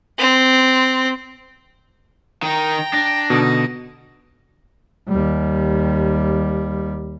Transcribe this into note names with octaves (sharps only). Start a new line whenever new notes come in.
C4
D#3 D#4 G5 A#5
D4 A#6
B2 D3 D#4
D#2 G3